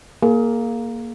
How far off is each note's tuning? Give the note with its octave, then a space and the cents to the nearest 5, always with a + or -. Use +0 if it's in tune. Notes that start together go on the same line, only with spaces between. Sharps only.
A#3 +0 G#4 +30